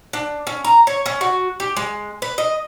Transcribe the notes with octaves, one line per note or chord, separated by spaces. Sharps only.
D4
C#4
A#5
C#5
C#4
F#4
G4
G#3
B4
D#5